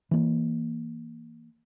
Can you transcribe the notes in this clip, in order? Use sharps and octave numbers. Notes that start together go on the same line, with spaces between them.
E3 A#3